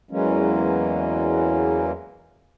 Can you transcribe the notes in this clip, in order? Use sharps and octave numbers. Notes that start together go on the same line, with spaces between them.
E2 E3 F#3 G#3 A#3 C#4